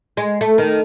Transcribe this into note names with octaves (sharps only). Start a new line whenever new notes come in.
G#3
A3
D#3